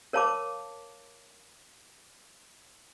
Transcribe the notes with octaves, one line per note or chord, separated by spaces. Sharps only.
A#4 C#5 F5 A5 B5 D6